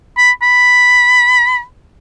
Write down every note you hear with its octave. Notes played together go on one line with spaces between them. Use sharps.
B5
B5